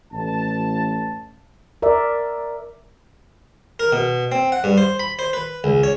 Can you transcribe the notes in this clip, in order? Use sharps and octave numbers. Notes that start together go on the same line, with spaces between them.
A1 A5
A#4 D5 E5
A#4
B2
C4
F#5
G2
C5
B5
C5
B4
C#2
C#5